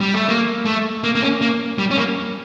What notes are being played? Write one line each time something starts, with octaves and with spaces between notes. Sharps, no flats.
G3
A3
A#3
A3
A#3
A#3
C#4
A#3
G3
C#4
A#3